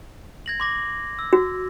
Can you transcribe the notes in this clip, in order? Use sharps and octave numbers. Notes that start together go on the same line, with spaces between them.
G#6 A#6 F#7
C6 D6 A#6
E6
F#4